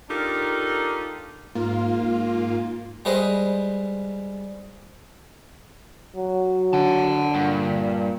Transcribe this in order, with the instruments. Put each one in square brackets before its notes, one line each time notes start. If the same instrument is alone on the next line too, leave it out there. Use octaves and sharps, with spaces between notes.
[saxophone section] D4 D#4 F4 G4 A4 A#4
[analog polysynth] G#2 A#3 F4
[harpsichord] G3 G#3 B4 C5 D#5
[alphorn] F#3
[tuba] D3 [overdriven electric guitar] F#5 A5
[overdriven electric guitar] G2 [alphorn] A#2